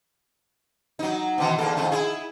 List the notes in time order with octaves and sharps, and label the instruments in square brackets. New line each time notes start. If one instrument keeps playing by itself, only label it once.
[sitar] F#3 D#4
B2 D#3 E3
E2 A#3 A4
F2 D#3 A3
E4 G#4